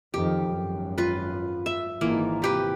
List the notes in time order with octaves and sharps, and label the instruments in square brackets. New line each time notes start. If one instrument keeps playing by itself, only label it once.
[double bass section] F2 D#3 [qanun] G4
[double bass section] G#1 F#2
[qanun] F4 B4
E5
[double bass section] G#1 D#3 [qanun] E3 A#3 F4
[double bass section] C3 [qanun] E3 G4 B4